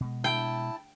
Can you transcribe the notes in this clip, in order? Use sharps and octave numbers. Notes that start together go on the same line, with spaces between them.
B2 G#3
E4 G5 A5